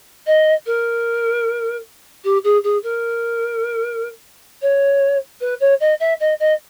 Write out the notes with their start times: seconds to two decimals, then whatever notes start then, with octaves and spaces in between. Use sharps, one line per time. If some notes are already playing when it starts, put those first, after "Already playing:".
0.26 D#5
0.66 A#4
2.24 G4
2.44 G#4
2.64 G#4
2.83 A#4
4.62 C#5
5.41 B4
5.60 C#5
5.80 D#5
6.00 E5
6.20 D#5
6.40 D#5